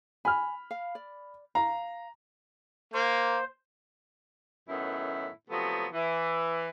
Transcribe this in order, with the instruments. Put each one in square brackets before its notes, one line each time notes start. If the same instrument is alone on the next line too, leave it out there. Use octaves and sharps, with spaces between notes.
[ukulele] G#5 [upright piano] B5 F6
[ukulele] F5
D5
[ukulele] F5 [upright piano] A#5
[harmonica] A#3 [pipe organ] C5
[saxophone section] F#2 A2 D#3 B3 E4
C3 F3 F#3 A3 B3
E3